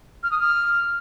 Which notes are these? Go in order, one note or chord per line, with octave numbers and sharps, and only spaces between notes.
F6
D#6
F6